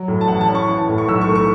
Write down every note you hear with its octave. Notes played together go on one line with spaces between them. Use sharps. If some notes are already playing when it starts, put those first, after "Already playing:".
Already playing: F#3
A2
A5
A1 F#5
A5
C#4
C#6
E3
A5
A2
C#6
B1 E6
C#6
A3
C#6